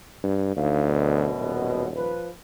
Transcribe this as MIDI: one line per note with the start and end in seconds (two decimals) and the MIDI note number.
0.24 0.56 43
0.56 1.31 38
0.56 0.87 63
0.56 0.87 77
0.87 1.89 42
0.87 1.89 47
1.39 2.16 27
1.95 2.28 53
1.95 2.28 71